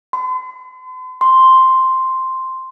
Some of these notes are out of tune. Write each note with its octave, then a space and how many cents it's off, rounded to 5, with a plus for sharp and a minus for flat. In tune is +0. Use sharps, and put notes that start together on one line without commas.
C6 -45
C6 +0